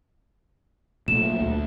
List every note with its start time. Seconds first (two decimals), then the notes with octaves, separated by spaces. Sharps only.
1.08 B1 A#2 A3 E7
1.41 D2